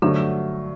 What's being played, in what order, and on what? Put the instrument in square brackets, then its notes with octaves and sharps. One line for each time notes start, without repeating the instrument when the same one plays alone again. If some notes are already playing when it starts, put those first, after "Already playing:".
[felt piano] G2 F#3 A3 [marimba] D3